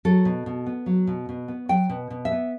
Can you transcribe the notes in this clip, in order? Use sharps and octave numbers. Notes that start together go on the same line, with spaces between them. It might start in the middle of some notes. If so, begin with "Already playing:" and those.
F#3 A4
B2
B2
B3
F#3
B2
B2
B3
F#3 G5
B2
B2
E5
B3